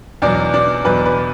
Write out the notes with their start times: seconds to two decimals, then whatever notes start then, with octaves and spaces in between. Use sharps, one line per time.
0.22 E2 B2 F#3 D4 D5
0.54 D4 D5
0.85 E2 B2 F#3 B4
1.05 B4